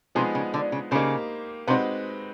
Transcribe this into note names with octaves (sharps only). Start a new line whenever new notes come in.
C3 F3 G#3 B3 D#4 G#4
C#3
D3
C#3
C#3 A#3 D#4 G4 C5
C3 G#3 C4 D#4 F#4 B4